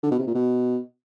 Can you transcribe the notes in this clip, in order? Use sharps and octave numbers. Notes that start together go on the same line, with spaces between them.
D3
B2
C3
A#2
B2